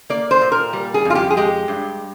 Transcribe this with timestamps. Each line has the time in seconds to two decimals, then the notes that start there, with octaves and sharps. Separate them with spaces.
0.10 A#3 D5
0.31 C5
0.42 A#2
0.52 A#4
0.73 G3
0.94 G#4
1.05 F2 F4
1.15 G4
1.30 G#4
1.37 G#3 G4
1.68 G2